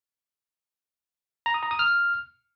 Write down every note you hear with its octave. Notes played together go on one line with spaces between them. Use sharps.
A#5
D#6
A#5
D#6
F6